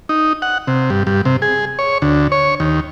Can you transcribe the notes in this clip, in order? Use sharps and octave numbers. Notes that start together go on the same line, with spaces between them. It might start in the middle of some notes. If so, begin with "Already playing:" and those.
D#4
F#5
C3
G2
G2
C3
G#4
C#5
D2
C#5
D#2